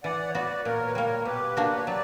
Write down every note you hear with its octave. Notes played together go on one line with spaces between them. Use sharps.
E3 D5 F#5
C#5
B3 F#4 B4 D5
A#2 A#4 C#5
B4
G3 A#3 A#4 C#5
B2 G4 B4
A#3 D4 F#4
C#5
F#3 B4 D5